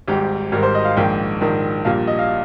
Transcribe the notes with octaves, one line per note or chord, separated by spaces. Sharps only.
G#1 G#2 G3 G4
G#1 G#2 G3 A#4
C5
D#5
F5
A#1 G#2 D#3 G5
A#1 G#2 D#3
A#1 A#2 G3 F5
D#5
F5